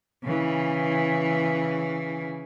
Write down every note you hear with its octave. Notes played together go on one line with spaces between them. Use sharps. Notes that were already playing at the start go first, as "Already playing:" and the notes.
C#3 E3